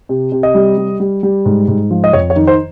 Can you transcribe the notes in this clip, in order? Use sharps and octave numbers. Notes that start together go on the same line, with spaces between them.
C3
C3
D#5
G3
G3
G3
G3
G#2
G#2
F3
D#5
F2 C#5
C#5
D#3
C5